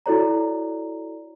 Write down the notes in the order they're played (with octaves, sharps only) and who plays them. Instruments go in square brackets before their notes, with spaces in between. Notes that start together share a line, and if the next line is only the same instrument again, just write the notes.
[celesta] E4 F#4 A4 C#5 D5 A#5